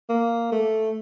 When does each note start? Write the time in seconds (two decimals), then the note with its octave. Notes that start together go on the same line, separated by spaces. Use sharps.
0.09 A#3
0.52 A3